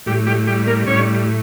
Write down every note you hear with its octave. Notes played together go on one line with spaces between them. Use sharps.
A2 G3 G4
G3 G4
G3 G4
A#3 A#4
A2 C#4 C#5